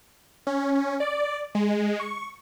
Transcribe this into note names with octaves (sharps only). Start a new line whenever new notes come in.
C#4
D5
G#3
C#6